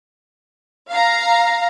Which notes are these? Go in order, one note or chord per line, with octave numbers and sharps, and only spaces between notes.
F5 A#5